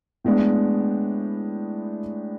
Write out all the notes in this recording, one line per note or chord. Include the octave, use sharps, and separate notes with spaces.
A2 G#3 B3 D4